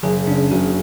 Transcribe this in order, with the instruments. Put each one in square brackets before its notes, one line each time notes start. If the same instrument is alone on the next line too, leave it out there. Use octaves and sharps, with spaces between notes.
[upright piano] F#1 [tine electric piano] G#4
[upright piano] C#3 [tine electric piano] D4
[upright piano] F#1 [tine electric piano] F#4